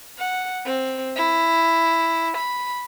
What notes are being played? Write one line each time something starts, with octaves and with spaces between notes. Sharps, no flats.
F#5
C4
E4
B5